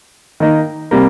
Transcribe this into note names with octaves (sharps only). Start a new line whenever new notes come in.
D#3 A#3 D#4
C3 G3 A#3